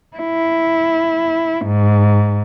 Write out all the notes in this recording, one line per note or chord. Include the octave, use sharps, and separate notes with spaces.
E4
G#2